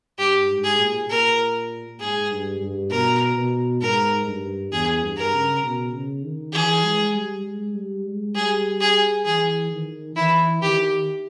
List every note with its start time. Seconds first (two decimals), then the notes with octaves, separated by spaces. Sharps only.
0.18 G2 G4
0.49 G#2
0.64 G#4
0.79 A#2
1.09 A#2 A#4
2.00 G#2 G#4
2.31 G2
2.61 G2
2.90 B2 A#4
3.37 B2
3.81 G#2 A#4
4.27 G2
4.72 E2 G#4
5.02 G2
5.17 A#4
5.33 C#3
5.63 B2
5.93 C#3
6.23 D#3
6.53 E3 G#4
6.84 G#3
7.14 G3
7.44 G#3
7.74 G3
8.05 G#3
8.35 G3 G#4
8.81 G#4
9.25 E3 G#4
9.71 D#3
10.16 E3 E4
10.62 D#3 G4